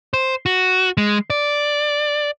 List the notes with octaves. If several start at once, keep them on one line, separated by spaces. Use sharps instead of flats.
C5
F#4
G#3
D5